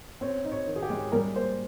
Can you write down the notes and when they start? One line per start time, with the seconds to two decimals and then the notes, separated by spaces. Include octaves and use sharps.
0.21 C4 C#5
0.44 D#4
0.52 C#5
0.67 D#3
0.76 G#4
0.83 G4
0.90 G#3
1.12 G3 A#4
1.35 A#3 C5